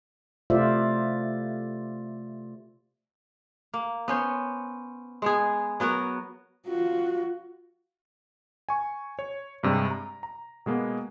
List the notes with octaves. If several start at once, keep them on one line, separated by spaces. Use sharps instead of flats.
C3 A3 F4 C5 D5 E5
A#3
B3 C#4 C5
G#3 B3 G#4
F#3 B3 F#4 A#4
F4 F#4
G#5 C#6
C#5
G2 C3 G3 G#3
A#5
A#5
B2 G#3 A#3 B3